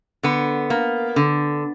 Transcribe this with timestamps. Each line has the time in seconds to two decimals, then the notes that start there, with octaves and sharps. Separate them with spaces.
0.23 D3 B3
0.70 A#3
1.16 D3